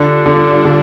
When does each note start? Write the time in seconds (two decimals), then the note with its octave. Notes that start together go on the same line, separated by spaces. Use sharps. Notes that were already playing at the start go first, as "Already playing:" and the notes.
Already playing: D3 G3 D4 F4
0.26 D3
0.65 D3